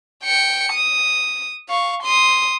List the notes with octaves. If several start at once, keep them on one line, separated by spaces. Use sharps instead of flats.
G5 C#7
D#6
F5 C#6
C6 D#6